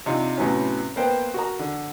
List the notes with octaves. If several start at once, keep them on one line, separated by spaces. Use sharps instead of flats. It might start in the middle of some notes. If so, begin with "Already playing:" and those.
C3 D4 D#4 F4
A2 C3 F#3 B3 C#4
A#3 B3 B4 C5 G5
F#4 A#4 A#5
D3